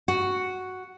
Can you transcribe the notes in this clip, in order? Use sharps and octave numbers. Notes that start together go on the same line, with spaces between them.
F#4